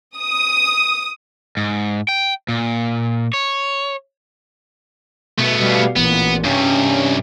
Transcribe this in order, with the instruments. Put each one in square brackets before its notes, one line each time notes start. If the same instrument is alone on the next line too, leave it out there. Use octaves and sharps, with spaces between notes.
[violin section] D#6
[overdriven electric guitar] G#2
G5
A#2
C#5
[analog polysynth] B2 [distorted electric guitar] A3 B3
[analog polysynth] B2 G3 F5
[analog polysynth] A1 A#2 [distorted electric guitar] B3
[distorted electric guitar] G2 C3 [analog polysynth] C#4